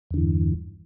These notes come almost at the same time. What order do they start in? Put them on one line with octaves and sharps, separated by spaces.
E2 D3 E3 G2